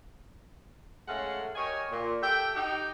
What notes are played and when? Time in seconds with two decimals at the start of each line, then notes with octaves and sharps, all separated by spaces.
1.08 G#3 A3 C#4 A4 F5 F#5
1.56 G4 A#4 C#5 D#5 G#5
1.91 A#2
2.22 G4 A4 E5 G5
2.55 D#4 G4 G5